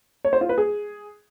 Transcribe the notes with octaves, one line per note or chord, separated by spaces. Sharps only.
C#5
C5
F4
B4
G#4